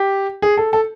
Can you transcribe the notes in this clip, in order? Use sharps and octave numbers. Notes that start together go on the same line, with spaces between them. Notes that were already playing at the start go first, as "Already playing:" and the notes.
Already playing: G4
G#4
A4
A4